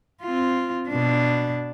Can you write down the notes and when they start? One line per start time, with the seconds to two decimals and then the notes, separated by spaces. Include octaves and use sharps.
0.23 C4 F4
0.89 B2 D4